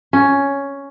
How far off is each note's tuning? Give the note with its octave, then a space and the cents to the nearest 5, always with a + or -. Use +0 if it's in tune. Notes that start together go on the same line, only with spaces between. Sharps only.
C#4 +5